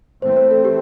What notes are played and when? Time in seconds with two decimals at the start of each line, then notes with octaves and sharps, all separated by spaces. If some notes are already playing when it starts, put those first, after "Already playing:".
0.22 E3 A3 C4 C5
0.36 C5
0.51 A4
0.65 G4